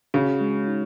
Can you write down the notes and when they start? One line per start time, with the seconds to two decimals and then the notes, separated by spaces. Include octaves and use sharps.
0.14 C#3 F#4
0.41 G#3
0.68 D#4